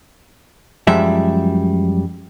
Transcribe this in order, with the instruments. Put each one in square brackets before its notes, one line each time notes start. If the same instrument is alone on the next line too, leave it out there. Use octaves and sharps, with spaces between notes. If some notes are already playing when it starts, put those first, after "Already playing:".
[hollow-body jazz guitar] F#2 F3 G3 G#3 E5